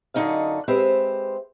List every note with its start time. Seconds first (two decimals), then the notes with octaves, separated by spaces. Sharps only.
0.14 F#2 D3 A3 D#4 D#5 F5
0.68 G#3 C4 G4 B4 C5 E5